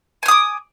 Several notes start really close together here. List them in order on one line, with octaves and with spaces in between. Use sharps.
G#5 F6 D#6 D6